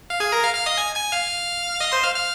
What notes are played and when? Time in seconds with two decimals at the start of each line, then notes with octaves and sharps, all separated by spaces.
0.10 F5
0.20 G#4 G#5
0.32 A#4 A#5
0.44 F5 F6
0.54 F5 F6
0.66 D#5 D#6
0.77 G#5 G#6
0.94 G#5 G#6
1.12 F5 F6
1.81 D#5 D#6
1.92 C5 C6
2.03 F5 F6
2.15 F5 F6